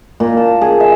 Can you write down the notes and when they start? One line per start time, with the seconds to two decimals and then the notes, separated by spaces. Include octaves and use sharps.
0.20 A#2
0.37 A5
0.61 G#4
0.80 E5